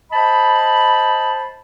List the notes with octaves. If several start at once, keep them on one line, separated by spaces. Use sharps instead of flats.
C5 D#5 A5 B5